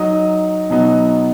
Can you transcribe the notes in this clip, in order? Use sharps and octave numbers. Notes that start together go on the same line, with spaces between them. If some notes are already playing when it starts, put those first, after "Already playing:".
Already playing: F#3 D#4 D#6
B2 F#3 B3 D#4